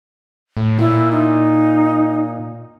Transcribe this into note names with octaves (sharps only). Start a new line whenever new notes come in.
A2
A#2 E4
D#4